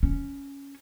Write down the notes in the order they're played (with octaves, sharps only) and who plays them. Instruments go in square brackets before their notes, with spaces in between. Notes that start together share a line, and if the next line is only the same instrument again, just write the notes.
[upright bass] C#4